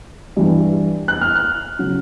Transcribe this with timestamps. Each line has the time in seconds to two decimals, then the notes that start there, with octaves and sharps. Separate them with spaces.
0.37 G2 E3 G3
1.08 F#6
1.21 F6
1.35 F#6
1.79 C#3 F#3